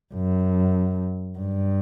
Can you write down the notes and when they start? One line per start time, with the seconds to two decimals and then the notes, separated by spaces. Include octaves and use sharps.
0.14 F#2
1.39 G2